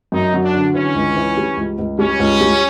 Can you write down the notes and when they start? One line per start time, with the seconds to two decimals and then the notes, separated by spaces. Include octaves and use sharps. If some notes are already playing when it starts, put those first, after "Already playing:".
0.12 F#2 D#4
0.34 F#3
0.43 D4
0.55 D3
0.74 E3 C#4
0.95 C#2
1.16 E3
1.37 G3
1.57 C#2
1.78 C#2
1.99 G3 C#4
2.19 C#2
2.41 G3